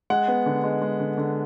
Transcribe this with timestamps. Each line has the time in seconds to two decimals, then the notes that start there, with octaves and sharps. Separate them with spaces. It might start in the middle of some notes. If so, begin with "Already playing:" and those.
0.10 G#3 F#5
0.28 B3
0.46 D3
0.64 G#3
0.82 G#3
1.00 D3
1.18 D3